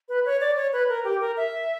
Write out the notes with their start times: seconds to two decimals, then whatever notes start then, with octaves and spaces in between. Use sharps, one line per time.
0.09 B4
0.25 C#5
0.41 D5
0.56 C#5
0.73 B4
0.89 A#4
1.04 G4
1.20 A#4
1.37 E5